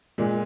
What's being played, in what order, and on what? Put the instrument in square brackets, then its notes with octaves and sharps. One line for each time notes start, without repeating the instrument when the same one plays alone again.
[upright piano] A#2 G#3